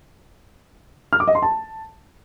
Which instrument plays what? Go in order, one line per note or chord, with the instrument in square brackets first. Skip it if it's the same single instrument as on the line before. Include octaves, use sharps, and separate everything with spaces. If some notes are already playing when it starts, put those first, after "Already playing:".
[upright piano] F6
D6
D#5
C6
A5